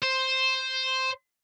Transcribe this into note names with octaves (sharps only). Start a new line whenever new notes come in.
C5